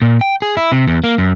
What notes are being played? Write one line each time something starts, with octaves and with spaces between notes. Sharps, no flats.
A#2
G5
G#4
E4
C3
E2
A#3
F#2